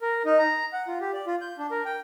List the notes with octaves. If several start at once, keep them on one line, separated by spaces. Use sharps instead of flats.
A#4
D#4
A#5
F#5
F4
G4
D5
F4
G6
D4
A#4
G5